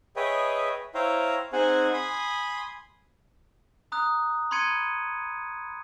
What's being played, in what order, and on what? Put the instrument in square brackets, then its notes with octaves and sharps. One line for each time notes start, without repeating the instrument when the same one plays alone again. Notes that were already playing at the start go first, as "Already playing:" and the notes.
[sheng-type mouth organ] G#4 B4 C#5 D#5 E5 G5
E4 C5 C#5 F5 G5 A#5
C4 D#4 G#4 C5 F#5 G#5
G#5 B5 C6 D#6
[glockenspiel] A#5 D#6 F#6
B5 C6 F#6 G#6 C#7 D#7